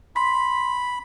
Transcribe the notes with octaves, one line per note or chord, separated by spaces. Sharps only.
B5 C6 B6